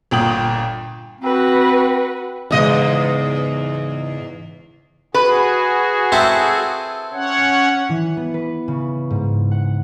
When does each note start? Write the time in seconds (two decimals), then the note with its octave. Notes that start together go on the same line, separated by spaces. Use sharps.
0.11 G1 A#2 G5 D#6 F#7
1.21 C4 F#4 B4
2.51 E2 G#2 C#3 G#3 D#5
5.14 F#4 G#4 B4
6.12 C4 E4 A4
7.13 C#4 C#5 F#5
7.89 E3
8.17 B3
8.34 B4
8.68 C#3
9.11 G#2
9.51 F#5